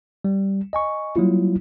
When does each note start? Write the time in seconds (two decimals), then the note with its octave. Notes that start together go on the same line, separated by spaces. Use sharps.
0.25 G3
0.73 D#5 G#5 C#6
1.16 F#3 G3 A#3 E4 F4